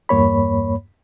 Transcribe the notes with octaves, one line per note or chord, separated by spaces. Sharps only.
E2 G2 A#3 C#5 B5